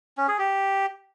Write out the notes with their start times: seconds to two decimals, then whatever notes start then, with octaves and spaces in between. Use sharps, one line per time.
0.18 C#4
0.28 G#4
0.39 G4